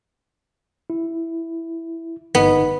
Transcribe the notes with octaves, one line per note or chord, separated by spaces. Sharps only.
E4
G1 B3 D#4